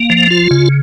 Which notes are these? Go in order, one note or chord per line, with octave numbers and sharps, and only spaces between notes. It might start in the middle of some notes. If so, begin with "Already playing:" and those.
Already playing: A#3
F3
F4
C#3